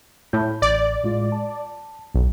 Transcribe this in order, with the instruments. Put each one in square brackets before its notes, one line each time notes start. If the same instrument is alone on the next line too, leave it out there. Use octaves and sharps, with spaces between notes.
[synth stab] A2 [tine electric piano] B5 G6
[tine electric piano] A1 [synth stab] D5
[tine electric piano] A2 G#3 F4
A5
[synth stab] B1